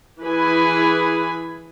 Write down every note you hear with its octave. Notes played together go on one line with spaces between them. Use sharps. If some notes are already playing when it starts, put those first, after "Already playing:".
E3 E4 G#4 B4 G#5 B5